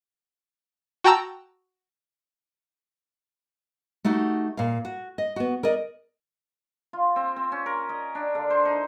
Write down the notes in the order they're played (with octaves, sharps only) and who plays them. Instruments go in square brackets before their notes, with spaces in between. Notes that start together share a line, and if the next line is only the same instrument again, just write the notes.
[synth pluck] F#4 G5 A5 A#5 E6
[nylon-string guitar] A3 D#4 F#4 G4
A#2 F5
F#4
D#5
B3 F#4
A#4 D5 D#5
[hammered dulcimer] F4
C4
C4
C#4
A#4
D#5
D4
D3
C5
D#4